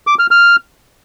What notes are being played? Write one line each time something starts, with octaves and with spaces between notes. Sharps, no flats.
D6
F6
F6